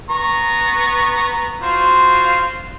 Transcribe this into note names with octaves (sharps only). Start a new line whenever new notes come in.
B3 A#5 C#6
F4 F#4 C5